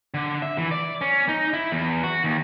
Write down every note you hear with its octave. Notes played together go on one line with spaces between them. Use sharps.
D3
E5
E3
D5
C#4
D#4
E4
E2
F#4
D#2